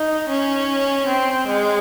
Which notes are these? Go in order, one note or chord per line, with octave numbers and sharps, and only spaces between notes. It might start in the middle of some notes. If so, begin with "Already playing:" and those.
Already playing: D#4
C#4
C4
G#3